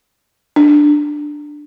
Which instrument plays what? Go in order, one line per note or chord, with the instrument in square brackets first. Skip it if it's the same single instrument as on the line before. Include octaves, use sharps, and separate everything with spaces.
[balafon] D4